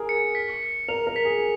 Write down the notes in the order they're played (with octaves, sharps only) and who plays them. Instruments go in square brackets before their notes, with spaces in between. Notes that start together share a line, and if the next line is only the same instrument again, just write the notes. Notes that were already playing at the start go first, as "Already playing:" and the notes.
Already playing: [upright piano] G#4 A#4
[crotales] C#7
B6
B6
[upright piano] A#4 [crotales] F7
[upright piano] A#4
[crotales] B6
[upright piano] G#4